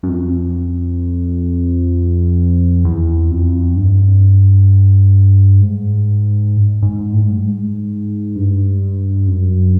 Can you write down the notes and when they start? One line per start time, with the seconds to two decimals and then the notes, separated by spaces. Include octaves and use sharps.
0.03 F#2
0.09 F2
2.85 E2
3.30 F2
3.76 G2
5.60 G#2
6.82 G#2
7.13 A2
7.22 G#2
7.31 G2
7.40 G#2
8.36 G2
9.27 F#2